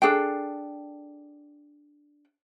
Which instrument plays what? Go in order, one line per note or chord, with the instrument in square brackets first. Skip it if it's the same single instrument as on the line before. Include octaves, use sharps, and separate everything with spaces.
[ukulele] D4 G#4 A4 G5